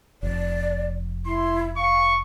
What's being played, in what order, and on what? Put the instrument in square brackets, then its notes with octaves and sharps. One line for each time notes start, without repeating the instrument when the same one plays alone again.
[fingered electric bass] F1 [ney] D5
[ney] E4 [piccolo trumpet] C6
[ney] F5 [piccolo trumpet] C#6